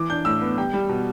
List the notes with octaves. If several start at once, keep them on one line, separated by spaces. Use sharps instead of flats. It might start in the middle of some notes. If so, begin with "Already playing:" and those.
Already playing: E3 D6
D4 G6
A2 E6
B3
G3 G5
G3
B2